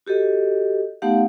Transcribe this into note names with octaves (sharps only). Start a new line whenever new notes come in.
F#4 G4 A4 D#5
A3 B3 D#4 G4 F5 F#5